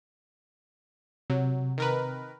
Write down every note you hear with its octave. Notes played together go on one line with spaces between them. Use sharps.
C3 F#3
D#3 A#4 B4